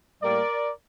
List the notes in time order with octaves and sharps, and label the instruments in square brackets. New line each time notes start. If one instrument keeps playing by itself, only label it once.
[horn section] A2 G3 A#3 A#4 D5